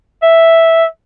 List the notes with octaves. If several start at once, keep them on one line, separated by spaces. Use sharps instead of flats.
E5